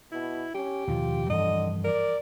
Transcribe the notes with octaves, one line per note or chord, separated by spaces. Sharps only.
B2 E4
C#4 G4
D#2 B2 F3 F4
G2 D3 E3 F3 D#5
A#4 D5